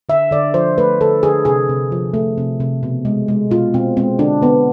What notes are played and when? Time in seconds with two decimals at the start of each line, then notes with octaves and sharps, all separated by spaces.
0.09 D3 E5
0.31 D3 D5
0.54 F3 C5
0.78 A3 B4
1.01 D3 A4
1.23 D3 G#4
1.45 C3 G#4
1.69 C3
1.92 F3
2.14 A3
2.38 C3
2.60 C3
2.83 B2
3.05 G#3
3.28 G#3
3.51 B2 F4
3.74 B2 C4
3.97 G#3 C4
4.19 D3 D4
4.42 D3 B3